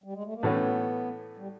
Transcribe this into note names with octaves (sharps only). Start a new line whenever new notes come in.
G3
G#3
A3
A#3
A2 E3 A3 B3 C#4 F#4
G3